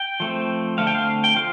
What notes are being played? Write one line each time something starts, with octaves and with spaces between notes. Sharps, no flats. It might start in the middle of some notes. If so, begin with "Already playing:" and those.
Already playing: G5
F3 A3 C4
D3 A3 C4 F5
G5
F5
G5
F3 F5